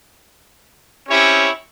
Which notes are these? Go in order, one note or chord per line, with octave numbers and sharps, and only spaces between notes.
C4 C#4 E4 G4 C#5